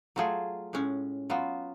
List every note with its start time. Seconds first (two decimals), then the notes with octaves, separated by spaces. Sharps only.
0.16 F#3 A3 F4 G#4
0.73 A2 G#3 C#4
1.30 F#3 B3 F4